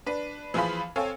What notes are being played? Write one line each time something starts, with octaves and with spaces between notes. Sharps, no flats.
D4 B4
E3 F3 F4 G#4 F5 B5
C4 A4 C#5 F5 G#5